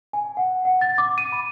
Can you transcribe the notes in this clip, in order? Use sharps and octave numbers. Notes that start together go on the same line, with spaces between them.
G#5
F#5
F#5
A6
D6
D#7
B5